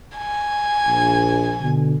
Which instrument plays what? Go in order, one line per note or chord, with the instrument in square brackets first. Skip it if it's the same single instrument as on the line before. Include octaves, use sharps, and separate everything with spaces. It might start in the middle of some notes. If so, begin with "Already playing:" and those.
[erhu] G#5
[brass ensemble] A#1
B2 D3